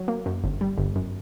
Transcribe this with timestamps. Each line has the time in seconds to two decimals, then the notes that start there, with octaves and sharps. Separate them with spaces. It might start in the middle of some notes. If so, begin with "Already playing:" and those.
Already playing: F#3
0.08 A#3
0.26 F#2
0.44 G1
0.61 G3
0.78 G1
0.96 F#2